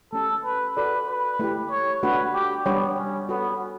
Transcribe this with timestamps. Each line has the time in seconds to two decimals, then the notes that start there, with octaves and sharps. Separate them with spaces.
0.13 A3 C#4 G4 A4
0.45 B4
0.76 F#4 A4 B4 D5
1.08 B4
1.39 A3 E4 G4
1.71 C#5
2.02 A3 D4 F#4 B4
2.34 G4
2.66 G3 B3 D4 G4 C#5 G5
2.98 C#4
3.29 B3 F#4 A4 C#5